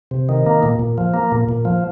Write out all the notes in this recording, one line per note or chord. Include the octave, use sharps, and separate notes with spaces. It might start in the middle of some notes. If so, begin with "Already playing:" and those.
C3
D#3
A#3
A#2
A#2
F3
A#3
A#2
A#2
F3